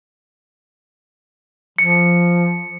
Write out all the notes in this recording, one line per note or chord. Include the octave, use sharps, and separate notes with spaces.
F3 C#7